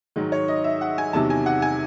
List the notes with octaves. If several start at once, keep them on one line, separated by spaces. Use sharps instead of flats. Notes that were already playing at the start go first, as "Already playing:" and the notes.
G#2 D#3 F#3
C#5
D#5
E5
F#5
G#5
E2 C3 D#3 F#3 A5
G#5
F#5
G#5